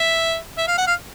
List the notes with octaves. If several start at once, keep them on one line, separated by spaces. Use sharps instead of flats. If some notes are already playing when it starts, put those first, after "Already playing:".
Already playing: E5
E5
F5
F#5
F5